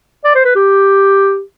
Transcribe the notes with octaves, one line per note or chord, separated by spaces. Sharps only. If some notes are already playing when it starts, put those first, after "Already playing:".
D5
C5
B4
G4